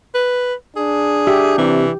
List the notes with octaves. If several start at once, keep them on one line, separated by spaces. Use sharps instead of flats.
B4
D4 G#4
G4 E5
C3 E3